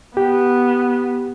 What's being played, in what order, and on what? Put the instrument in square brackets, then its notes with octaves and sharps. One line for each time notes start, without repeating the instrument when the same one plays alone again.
[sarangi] B3 [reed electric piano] G4